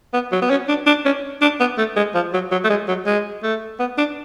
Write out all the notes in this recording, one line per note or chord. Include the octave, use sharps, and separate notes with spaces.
B3
F#3
B3
C#4
D4
D4
C#4
D4
B3
A3
G#3
F3
F#3
F#3
A3
G#3
F#3
G#3
A3
B3
D4